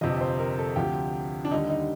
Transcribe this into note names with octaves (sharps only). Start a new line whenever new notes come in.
G1 F2 C3 F3 D#5
C5
A#4
A4
D2 C3 F3 G4
D4
D#2 D3 G3 D#4
D#4